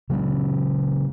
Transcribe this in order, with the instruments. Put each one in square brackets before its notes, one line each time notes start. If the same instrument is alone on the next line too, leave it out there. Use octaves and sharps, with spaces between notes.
[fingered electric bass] C#3 F#3 G#3 C#4